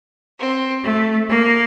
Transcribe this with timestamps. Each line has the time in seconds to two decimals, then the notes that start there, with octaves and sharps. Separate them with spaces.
0.38 C4
0.83 A3
1.28 A#3